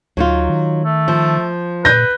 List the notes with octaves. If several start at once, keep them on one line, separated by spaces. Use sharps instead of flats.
D2 F#3 D#4 F4
D#3
A3
F3
A#2 B4 G6 A#6